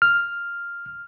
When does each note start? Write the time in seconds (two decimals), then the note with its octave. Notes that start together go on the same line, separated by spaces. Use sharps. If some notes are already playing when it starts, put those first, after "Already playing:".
0.02 F6